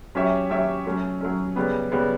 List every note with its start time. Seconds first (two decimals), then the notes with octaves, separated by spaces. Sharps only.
0.15 F#3 C#4 G4 C#5 E5
0.50 F#3 C#4 G4 C#5 E5
0.86 F#3 A3 C#4
1.21 F#3 A3 C#4
1.56 C#3 G3 B3
1.92 C#3 G3 B3